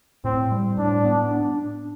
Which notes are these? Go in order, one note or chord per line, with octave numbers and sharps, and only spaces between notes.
A2 C4
G3
A2 D4
B3
D4